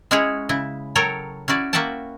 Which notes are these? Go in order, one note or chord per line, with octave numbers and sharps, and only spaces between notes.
G#3 C#4 E4 F#4 G#4 C#5
C#3 E4
F#3 A4 A#4 C#5 G5
C#4 E4 F#4 D5
A#3 F#4 E5 F#5 G5 A5